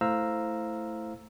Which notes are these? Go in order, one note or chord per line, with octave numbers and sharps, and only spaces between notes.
A3 E4 C5 F5 A#5 E6